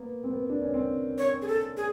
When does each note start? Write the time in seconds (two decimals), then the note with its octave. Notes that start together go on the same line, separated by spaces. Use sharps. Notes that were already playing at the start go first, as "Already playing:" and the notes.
Already playing: A#3 B3
0.24 C4
0.31 B3
0.49 D4
0.62 C#4
0.74 C4
1.18 C#5
1.42 G#4
1.48 A4
1.77 G#4